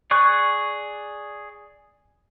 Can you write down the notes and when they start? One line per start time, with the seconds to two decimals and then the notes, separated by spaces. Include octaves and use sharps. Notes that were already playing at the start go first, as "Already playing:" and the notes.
0.11 G#4 D5 C#6 F#6